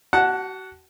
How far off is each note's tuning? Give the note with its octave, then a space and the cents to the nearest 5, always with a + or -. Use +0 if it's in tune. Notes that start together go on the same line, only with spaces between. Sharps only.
F#4 +40 F#5 -5 A5 +0